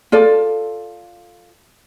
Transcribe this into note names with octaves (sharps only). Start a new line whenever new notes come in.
F4 A4 D5